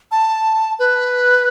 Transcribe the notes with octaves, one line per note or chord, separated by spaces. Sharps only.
A5
B4